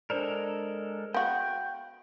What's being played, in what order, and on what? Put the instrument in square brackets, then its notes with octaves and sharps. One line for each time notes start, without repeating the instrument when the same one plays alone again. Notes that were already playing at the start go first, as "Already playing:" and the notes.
[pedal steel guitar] G#3 A4 A#4 [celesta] D4 C5 D5
[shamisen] B3 F#4 [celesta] F5 [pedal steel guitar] G5